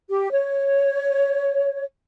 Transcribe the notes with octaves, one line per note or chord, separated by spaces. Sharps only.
G4
C#5